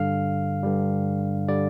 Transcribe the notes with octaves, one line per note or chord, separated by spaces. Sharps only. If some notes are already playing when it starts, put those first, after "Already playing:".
Already playing: G2 D3 G3 F5
G2 D3 G3
D3 G3 D5